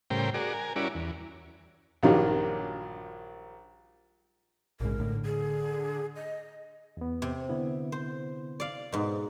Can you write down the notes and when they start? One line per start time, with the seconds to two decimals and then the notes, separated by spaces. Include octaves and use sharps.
0.10 A2 C#3 G3 A#4 C5 G5
0.34 F#4 G#4 A#4 D5
0.53 A#4 G#5
0.76 G3 C#4 E4 F#4 A#4 D5
0.95 E2
2.03 A#1 G2 D#3 F#3 G3 A#3
4.80 A#1 G#2 C#3 A#4
5.00 A2 D3
5.25 G#4
6.16 D#5
6.97 E2 B3
7.22 C3
7.49 D3 B3 E4
7.92 C5
8.60 D5 F5
8.92 G#2 B2